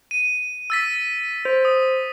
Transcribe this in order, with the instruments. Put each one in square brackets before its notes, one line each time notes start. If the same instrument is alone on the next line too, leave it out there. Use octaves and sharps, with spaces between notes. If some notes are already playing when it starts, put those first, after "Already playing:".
[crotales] D#7
E6 A6 B6
[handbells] C5
[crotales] D#6